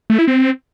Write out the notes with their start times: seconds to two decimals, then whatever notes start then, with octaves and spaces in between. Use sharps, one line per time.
0.10 A3
0.19 E4
0.28 C4